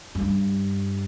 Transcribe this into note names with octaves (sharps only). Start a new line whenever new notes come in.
G2